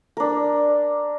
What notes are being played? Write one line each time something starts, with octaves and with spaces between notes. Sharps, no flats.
D4 A#4